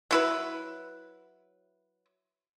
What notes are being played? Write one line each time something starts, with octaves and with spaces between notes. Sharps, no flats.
F#3 E4 B4